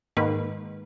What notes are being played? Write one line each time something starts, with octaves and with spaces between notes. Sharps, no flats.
G#2 D#3 A#3 B4